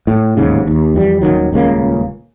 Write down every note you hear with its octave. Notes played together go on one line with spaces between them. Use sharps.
A2
D1 D#2 G#2 C#3
D#2
F2 E3 G3
D#1 E2 D#3 F#3
D#1 C#2 C#3 A#3